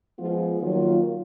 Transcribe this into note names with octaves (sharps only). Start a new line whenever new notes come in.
F3 G#3 B3 F4
D#3 F#3 A#3 F4